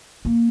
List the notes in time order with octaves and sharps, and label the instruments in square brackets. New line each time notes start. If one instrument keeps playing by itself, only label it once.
[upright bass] A#3